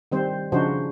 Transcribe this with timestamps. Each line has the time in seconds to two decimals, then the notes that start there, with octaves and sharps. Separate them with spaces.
0.12 D#3 G3 C4 C5
0.52 C#3 F3 D4 D#4 F#4 C5